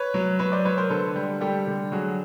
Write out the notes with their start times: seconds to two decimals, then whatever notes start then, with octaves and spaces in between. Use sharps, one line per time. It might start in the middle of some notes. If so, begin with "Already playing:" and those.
Already playing: B4 C#5
0.14 F#3
0.39 F#3 B4 C#5
0.52 C5 D5
0.65 F#3 B4 C#5
0.78 A#4 C5
0.90 D3 A4 B4
1.16 G3
1.41 G3 G4 A4
1.67 D3
1.92 F#3 F#4 G#4